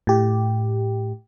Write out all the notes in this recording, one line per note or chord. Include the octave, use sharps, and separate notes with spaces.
A2 G4